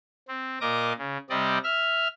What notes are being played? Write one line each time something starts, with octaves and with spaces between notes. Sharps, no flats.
C4
A#2 A#4 D#5 D6 A#6
C#3
C3 G3 C4 D5 D#5
E5 F6